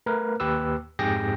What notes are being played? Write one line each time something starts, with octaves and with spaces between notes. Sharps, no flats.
A3 A#4 B4
D#2 G4 B4 E6
F2 G#2 G4 G#4 G5 A#6